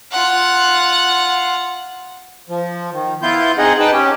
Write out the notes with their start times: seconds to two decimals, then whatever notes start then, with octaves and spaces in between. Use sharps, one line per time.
0.12 F4 F#5
2.49 F3
2.93 D#3
3.22 B3 E4 F4 C6 G6
3.58 C4 D#4 G#4 D#5 F#5
3.80 D#4 B4 G5 A5
3.93 C#4 G4